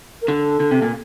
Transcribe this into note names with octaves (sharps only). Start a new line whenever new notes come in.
A#4
D3 A4
D3
C3
A#2